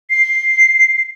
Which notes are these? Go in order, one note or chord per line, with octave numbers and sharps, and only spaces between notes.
C7